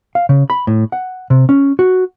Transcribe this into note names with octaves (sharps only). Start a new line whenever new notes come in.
F5
C#3
B5
A2
F#5
C3
C#4
F#4